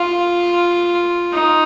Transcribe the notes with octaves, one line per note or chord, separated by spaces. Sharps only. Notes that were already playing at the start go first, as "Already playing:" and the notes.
Already playing: F4
D#4